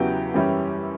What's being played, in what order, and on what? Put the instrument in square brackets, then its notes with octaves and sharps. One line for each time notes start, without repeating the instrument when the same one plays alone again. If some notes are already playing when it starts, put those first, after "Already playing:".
Already playing: [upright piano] E2 C#3 F#3 B3 E4 G4 G5
F#2 E3 G3 C#4 E4